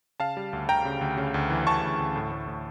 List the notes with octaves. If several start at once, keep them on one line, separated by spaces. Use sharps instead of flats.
C#3 F5 A5
G3
D2
D2 G5 A#5
C#3
D2
C#3
D2
E3
D2 A5 C#6
D2
D2
A2
A2
A2